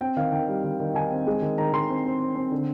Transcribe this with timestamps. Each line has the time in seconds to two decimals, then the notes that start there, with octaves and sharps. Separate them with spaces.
0.01 C4 G5
0.17 D#3 F5
0.32 D#3 G5
0.48 G3
0.64 D#3
0.80 D#3
0.95 D#3 G#5
1.11 C4
1.27 G#3
1.42 D#3
1.58 D#3 A#5
1.73 D#3 C6
1.89 C4
2.05 C4
2.20 C4
2.36 C4
2.52 D3